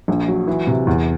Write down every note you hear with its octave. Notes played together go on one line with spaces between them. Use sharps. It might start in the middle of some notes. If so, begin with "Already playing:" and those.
A#1
F#3
E3
C3
E2